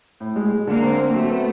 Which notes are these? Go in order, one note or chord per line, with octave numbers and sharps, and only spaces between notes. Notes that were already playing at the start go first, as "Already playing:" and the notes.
A2
G#3
G#3
D3 A#3
C4
C4
F#3 A3
B3